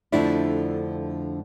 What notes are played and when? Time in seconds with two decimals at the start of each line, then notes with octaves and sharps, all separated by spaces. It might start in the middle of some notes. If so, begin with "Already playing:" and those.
0.12 F2 D3 F3 A3 D4 E4